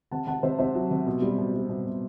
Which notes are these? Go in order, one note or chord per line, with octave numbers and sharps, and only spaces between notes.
C3 F#5 A5
C3 F#5 A5
C3 C5 E5
C3 C5 E5
F#3
C3
B2
G3
B2
G3
B2
B2